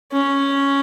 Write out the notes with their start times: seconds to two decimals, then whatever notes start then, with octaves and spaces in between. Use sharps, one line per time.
0.12 C#4